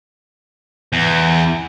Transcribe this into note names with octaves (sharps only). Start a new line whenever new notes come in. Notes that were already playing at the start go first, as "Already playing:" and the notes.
E2